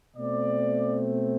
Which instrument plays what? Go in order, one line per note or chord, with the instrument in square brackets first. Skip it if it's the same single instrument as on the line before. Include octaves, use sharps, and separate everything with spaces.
[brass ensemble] B2 A3 C4 D5